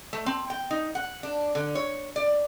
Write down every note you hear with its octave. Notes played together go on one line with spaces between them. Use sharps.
A3
C4
G5
D#4
F#5
D4
D3
C#5
D5